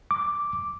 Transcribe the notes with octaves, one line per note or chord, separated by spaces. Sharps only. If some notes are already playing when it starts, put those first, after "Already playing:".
D6